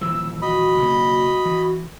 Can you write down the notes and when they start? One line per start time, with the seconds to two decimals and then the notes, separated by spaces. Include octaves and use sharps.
0.01 D#1 E3 F3 E6
0.42 F#4 D#5 B5
0.78 B1 C#3 A#3
1.45 E3